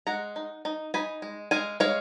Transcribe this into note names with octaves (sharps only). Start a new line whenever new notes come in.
G#3 F#5 A#5
D#4
D#4
D#4 G#5 B5
G#3
G#3 F5 G#5
G#3 C#5 F5